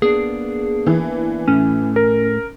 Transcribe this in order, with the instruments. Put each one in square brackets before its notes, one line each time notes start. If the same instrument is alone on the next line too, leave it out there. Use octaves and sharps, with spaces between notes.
[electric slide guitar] A#3 B3 D4 [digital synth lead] G#4
[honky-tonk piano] E3
[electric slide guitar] A2 A3 [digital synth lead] C#4
[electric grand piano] A#4